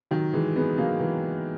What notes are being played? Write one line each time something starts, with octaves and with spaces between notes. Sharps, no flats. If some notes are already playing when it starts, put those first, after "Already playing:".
D#3 F#3
E3 G#3
G#3 B3
F#3 A#3
E3 G#3